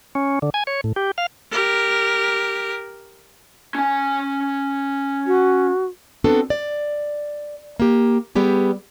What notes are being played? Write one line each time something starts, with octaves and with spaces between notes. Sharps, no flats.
C#4
D3
G#5
C#5
A2
G4
F5
G4 A#4
C#4 G#5
F#4
B3 C4 D4 F#4 A4
D5
A#3 G4
G3 B3 G4 G#4